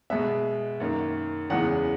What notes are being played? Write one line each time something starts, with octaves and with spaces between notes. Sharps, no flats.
B2 G#3 B3 E5
F#2 D#3 A#3
E2 C#3 E3 G#3 B3 F#5